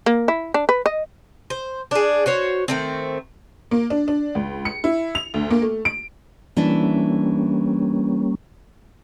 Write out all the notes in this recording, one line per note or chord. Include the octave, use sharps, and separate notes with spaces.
A#3
E4
D4
B4
D#5
C5
D4 G#4
F#4 C5 C#5
D#3 A3 C4
A#3
D4
D4
C#2
C#7
E4
F7
D2
A#3
A3
D7
E3 G3 A#3 C#4 D4 E4